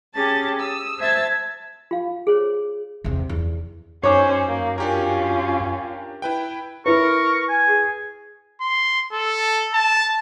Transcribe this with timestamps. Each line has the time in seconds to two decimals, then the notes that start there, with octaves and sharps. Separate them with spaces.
0.14 C#4 G4 G#4 A5 A6
0.59 D#6 E6
0.99 C5 E5 A5 E6 G#6 A6
1.91 F4 F5
2.27 G#4 C5 C#5
3.04 E2 C3
3.29 E2
4.03 F#2 C#4 D#4 C5 C#5 D6
4.49 A#3
4.78 C#4 D4 F4 G4 A#4
6.22 E4 B4 G5
6.86 E4 A#4 B4 C#6
7.49 G#5
7.66 G#4
8.61 C6
9.13 A4
9.74 A5